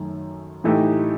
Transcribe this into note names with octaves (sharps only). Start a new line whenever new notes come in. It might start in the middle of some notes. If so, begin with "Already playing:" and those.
Already playing: F#2 D#3 A3
A2 E3 A3 D#4 G4